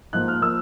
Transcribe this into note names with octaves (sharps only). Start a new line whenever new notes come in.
G#2 F3 A#3 F#6
F6
F3 A#3 E6